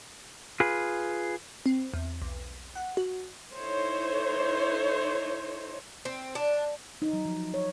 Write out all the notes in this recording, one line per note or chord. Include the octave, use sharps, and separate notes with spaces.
F4 G#4 B4
C4
E2
B1
F#5
F#4
D#4 E4 A4 C5 C#5
C4
D4
D#4
F#3
F3
C#5